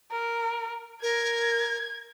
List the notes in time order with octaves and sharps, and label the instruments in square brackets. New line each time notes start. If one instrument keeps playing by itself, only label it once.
[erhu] A#4
[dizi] A#4 [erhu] G#6